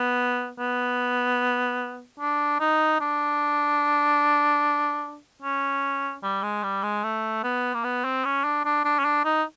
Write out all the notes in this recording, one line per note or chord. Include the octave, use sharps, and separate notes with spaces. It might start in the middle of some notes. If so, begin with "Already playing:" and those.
Already playing: B3
B3
D4
D#4
D4
C#4
G3
G#3
G3
G#3
A3
B3
A#3
B3
C4
C#4
D4
D4
D4
C#4
D4
D#4